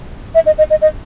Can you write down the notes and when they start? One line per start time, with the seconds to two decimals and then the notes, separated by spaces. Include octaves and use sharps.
0.35 E5
0.46 D#5
0.58 D#5
0.70 D#5
0.82 D#5